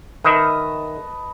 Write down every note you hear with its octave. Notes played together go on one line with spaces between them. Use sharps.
D#3 B4 D#5 E5 A5